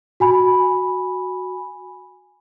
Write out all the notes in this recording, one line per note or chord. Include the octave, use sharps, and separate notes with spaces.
F#4 G#5 B5